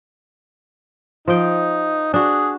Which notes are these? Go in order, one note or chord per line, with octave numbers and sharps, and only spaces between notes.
F3 D#4 G5
D4 F#4 G#4